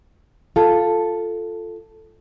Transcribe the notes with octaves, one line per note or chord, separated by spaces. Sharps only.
F4 A4